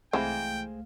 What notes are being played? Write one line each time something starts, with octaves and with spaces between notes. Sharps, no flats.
C2 E3 G#3 A3 C4 G#4 F5 G5